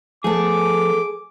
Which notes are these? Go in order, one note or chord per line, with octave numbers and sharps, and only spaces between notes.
F3 A3 B3 G#4 A4 D6